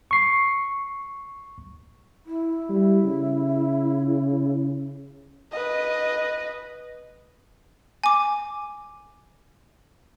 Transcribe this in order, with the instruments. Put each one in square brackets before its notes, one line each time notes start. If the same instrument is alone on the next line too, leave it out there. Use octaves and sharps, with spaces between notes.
[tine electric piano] C#6 C7
[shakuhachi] E4
[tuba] G3
C#3
[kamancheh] B4 D#5
[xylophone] G#5 D6